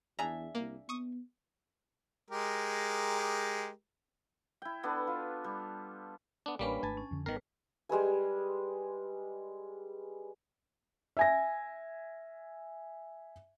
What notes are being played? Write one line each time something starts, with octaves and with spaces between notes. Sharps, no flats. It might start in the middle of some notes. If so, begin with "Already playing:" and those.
E2 D4 G#4 E5 A#5
C2 A#3
B3 C#6 D#6
G#3 G4 A#4
E4 G5
B3 D4 A4 B4
F4
G3
B3 D4
A1 G3 A#3 C#4 D4 B4 B5
G#1 A3 G#5 A5
C#4
F2 D3
G#1 D#3 G3 B3 A#4 B4
G3 G#3 B4 G#5
E5 G#5 A#6